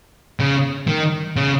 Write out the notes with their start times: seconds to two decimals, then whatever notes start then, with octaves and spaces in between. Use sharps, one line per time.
0.40 C#3
0.87 D#3
1.37 C#3